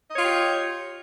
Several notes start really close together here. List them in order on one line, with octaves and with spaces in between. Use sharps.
D#5 C#5 F4 G4